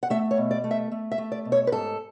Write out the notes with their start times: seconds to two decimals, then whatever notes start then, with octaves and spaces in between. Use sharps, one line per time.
0.03 F#5
0.10 A3 E5
0.31 C#5
0.38 B2
0.51 D5
0.64 A3
0.71 E5
0.92 A3
1.11 E5
1.18 A3
1.32 D5
1.45 B2
1.52 C#5
1.67 B4
1.72 G#2 A4